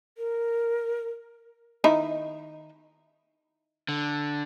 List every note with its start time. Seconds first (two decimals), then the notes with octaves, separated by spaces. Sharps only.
0.18 A#4
1.84 D#3 D#4 E4
3.89 D3